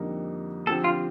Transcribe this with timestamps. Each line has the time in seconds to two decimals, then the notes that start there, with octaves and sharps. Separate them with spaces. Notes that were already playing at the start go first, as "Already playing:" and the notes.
Already playing: F2 D3 G3 A#3 D#4
0.67 D3 F3 C4 G4 A4
0.84 F4